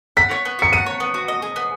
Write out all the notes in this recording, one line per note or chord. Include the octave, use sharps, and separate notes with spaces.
F#5 B6
C#5
B3
F#4 C#7
F#5 D#7
C#5
B3
F#4
D#5
G#4
B3